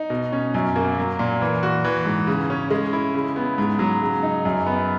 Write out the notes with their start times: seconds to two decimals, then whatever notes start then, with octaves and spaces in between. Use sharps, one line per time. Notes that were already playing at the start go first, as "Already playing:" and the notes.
Already playing: D#4
0.10 B2
0.32 C#4
0.54 F#2
0.76 A#3
0.98 F#3
1.19 A#2
1.41 E3
1.63 F#4
1.84 E3
2.05 G#2
2.27 C#3
2.50 C#4
2.70 G#3
2.93 E4
3.14 C#3
3.36 B3
3.58 G#2
3.79 F#3
4.02 C#3
4.23 D#4
4.45 F#2
4.66 B3